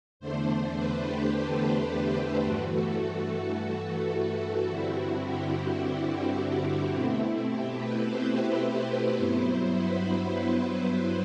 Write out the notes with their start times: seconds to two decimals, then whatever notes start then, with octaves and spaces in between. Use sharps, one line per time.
0.20 E2 D3 A3 D4 C5
0.76 B4
1.04 G4
2.44 G2 E3 A3 F#4
2.73 A4
4.13 A4
4.69 G2 D3 G3 C4 E4 F#4
5.25 G4
6.93 B2 A3 C4 E4
7.49 G4
7.77 B4
8.05 C5
9.17 G2 F#3 B3 E4
9.74 B4
10.29 C5
10.86 B4